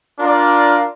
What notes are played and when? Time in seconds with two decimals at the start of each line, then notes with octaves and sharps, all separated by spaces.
0.18 D4 F4 A#4 D5